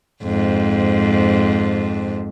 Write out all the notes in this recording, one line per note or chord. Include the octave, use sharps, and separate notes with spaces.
F2 G#2